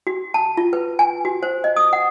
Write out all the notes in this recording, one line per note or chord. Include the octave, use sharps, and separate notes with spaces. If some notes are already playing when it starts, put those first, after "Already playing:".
F#4
A5
F4
B4
G#5
F#4
C5
D#5
D#6
F#5